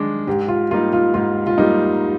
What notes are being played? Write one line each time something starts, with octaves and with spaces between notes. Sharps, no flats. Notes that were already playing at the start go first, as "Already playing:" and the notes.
Already playing: D#3 G#3 D4
G#2 G4
F4
G3 A#3 D#4 F4
F4
G#2 F4
F4
G3 A#3 D#4